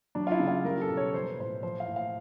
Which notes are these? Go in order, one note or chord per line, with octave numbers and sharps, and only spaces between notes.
F#3 D4
F4
E4
C#3
F4
G3 A#4
A4
B2
C#5
F3 C5
B4
A2 C5
F3 C5
F5
A2
F5